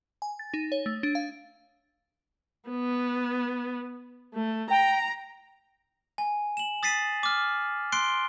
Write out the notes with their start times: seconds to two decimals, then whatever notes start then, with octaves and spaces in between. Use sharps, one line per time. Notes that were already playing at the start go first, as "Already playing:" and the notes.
0.22 G#5
0.39 A6
0.54 D#4
0.72 C#5
0.86 A3
1.03 D4
1.15 F5
2.70 B3
4.34 A3
4.70 G5 A#5
6.18 G#5
6.57 E7 F#7
6.83 D#6 A6 B6 C7 D#7
7.23 D6 F6
7.92 C6 F#6 C7 D7 G7